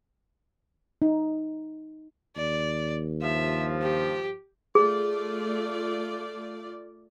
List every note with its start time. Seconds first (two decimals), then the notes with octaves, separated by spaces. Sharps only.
1.02 D#4
2.36 D#2 D5
3.22 G2 F3 E5
3.82 G4
4.75 A3 F4 G#4 D5